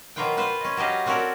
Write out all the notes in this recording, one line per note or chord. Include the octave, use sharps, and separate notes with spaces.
B2 F#3 A#3 F4 B4 G5
F4 B4 C5
C#4 D#5
F#3 F#4 G4 D#5 F5
C4 C#4 F#4 A4 A#4 D5